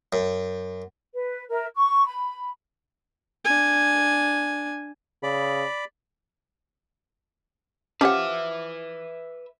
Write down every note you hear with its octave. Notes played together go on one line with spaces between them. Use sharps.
F#2
B4
A#4 E5
C#6
B5
D4 G#5
C#3 D5 B5
F3 C#4 G4 B4 E5 F#5 D6 F6